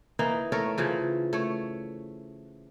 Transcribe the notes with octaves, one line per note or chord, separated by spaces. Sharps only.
E3 A#3 D#4
A3 A4 A#4 C#5
C#3 E3 F3
A3 C#5